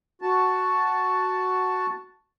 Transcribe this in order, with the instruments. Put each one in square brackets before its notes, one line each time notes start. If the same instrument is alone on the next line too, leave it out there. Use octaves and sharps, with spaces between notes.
[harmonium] F#4 A5